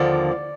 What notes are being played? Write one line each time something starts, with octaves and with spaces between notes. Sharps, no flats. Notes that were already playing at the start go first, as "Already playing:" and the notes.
Already playing: D#2 D3 F3 A#3 D5